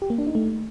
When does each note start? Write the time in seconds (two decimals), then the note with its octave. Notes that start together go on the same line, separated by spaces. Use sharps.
0.02 G4
0.10 A#3
0.18 D4
0.27 D#4
0.35 A3